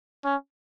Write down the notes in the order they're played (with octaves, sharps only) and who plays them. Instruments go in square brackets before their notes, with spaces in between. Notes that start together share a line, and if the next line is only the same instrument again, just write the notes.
[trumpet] C#4